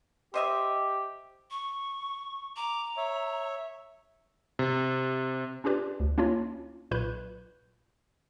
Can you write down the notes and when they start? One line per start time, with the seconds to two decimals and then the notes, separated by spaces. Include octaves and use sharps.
0.34 G4 C5 D#5 E5
1.51 C#6
2.56 A#5 D6
2.97 C#5 E5
4.59 C3
5.64 C#4 D4 F4 G4 B4 D5
6.00 D2
6.18 A#3 C#4 D4 E4 F4 C#5
6.91 B1 A#2 B4 B5 F#6 G6